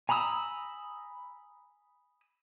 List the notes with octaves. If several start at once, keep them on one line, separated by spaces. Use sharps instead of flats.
G#5 A#5 B5 D#6 E6